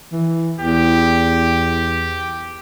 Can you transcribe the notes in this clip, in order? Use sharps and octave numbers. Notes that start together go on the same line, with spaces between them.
E3
E2 G4